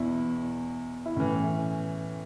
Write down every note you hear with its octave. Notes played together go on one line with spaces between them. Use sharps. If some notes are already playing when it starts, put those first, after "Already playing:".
Already playing: E2 B2 E4
E4
A2 E3 C#4